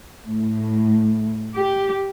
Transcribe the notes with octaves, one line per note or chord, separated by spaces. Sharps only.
A2
G4